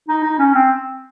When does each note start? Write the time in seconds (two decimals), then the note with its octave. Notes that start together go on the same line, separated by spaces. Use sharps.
0.09 D#4
0.23 D#4
0.39 C#4
0.54 C4